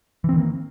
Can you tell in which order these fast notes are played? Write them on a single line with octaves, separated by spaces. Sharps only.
E3 C4 D#3 A#3